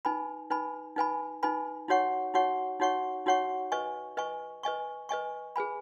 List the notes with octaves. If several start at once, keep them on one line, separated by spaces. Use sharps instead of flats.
D#4 B4 G#5 B5
D#4 B4 G#5 B5
D#4 B4 G#5 B5
D#4 B4 G#5 B5
D#4 F#4 C#5 F#5 C#6
D#4 F#4 C#5 F#5 C#6
D#4 F#4 C#5 F#5 C#6
D#4 F#4 C#5 F#5 C#6
B4 D#5 G#5 C#6
B4 D#5 G#5 C#6
B4 D#5 G#5 C#6
B4 D#5 G#5 C#6
G#4 B4 G#5 B5